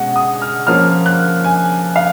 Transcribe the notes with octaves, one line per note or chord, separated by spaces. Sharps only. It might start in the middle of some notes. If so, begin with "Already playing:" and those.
Already playing: B2 G#3 C#4 F#5
D#6
F6
F3 A#3 C#4 F6
F#6
G#5
F5